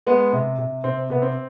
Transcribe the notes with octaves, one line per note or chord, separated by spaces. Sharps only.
G#3 B3
C3
C3
C3 C4
C3 B3
C4